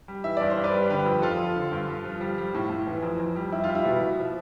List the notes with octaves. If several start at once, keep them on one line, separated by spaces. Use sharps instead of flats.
G3
E3 E5
G2 D5
C5
G2
B4 D5
G3
D3 G4 B4
F2
F2 F4 A4
F3
D3
G2
G2
F3
G3
G3
A2
A2
E3
F2
F2
G3
G3 E4
F4
G3
E4
B2
B2
F3